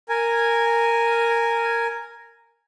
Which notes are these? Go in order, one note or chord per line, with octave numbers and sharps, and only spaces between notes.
A#4 G#5